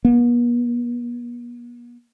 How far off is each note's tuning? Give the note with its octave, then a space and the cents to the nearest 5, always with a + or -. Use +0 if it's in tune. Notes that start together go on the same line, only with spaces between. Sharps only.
B3 -45